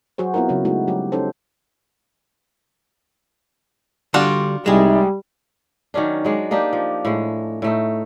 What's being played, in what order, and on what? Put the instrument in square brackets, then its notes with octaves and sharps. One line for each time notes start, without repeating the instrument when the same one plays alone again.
[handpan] F#3 F#4 G#4 C5
B3 C4 E4 F4 A#4
C#3 F#3 C4 C#4
G#3 A3 D#4 E4 F#4
F#3 G3 G4
C#4 D#4 A4 C5
[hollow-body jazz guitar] D3 G3 [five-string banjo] D4 F4 F#4
[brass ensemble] C2 D#4 E5 [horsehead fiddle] G3 [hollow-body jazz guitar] G#3 G#4
[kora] D#3 F#3 C#4 D4
F#3 G#3 D5
A#3 D4 D#4 G4
F3
A2 G#3
A2 A3 D#4